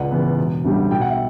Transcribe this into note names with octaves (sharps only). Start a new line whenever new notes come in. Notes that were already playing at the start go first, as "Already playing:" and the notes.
Already playing: C#2 D5 F#5
C#3 E3 B3
E1
D2 D3 G3 C#4
B1 G5
F#5
E5 G5